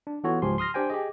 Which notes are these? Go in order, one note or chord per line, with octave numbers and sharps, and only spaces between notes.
D4
E3 B3 F4 F#4 A4 C#5
C#2 G#2 F3 G4 G#5 C6
C6 D#6 F6 A#6
D4 G4 C5 G5 G#5
G4 G#4 D#5